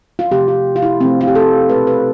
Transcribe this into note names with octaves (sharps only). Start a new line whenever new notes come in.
F4
C3 F3 A3 G4
F4
F4
E4
C3 F3 A3 C4
F4
G4
A4
B2 A3 B4
B4